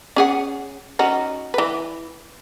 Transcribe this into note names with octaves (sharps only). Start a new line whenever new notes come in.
C#4 G#4 F#5
C#4 D#4 F#4
E3 B4